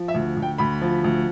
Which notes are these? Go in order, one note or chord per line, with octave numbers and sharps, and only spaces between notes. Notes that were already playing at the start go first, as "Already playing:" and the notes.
Already playing: F3
E5
D2
D2
G5
D2 B5
F3
D2